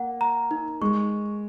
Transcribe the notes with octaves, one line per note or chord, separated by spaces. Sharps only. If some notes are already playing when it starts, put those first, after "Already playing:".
Already playing: A#3 F#5
A#5
D#4
G#3 C#6